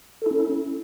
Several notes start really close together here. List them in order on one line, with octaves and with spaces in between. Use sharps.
A4 E4 C#4